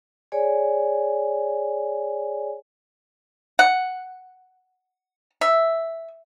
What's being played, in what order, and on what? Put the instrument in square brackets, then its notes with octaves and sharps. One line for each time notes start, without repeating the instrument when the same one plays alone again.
[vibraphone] G#4 C#5 D5 G#5
[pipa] F#5
E5